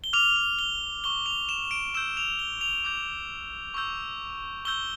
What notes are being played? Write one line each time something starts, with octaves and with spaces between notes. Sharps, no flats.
G7
D6 F6 F7
F7
G7
C#6 F6 G7
F7
E7
D7
C#6 E6 G6 E7
F7
G7
F7
D6 G6
C#6 E6 G6
C#6 E6 G6 G7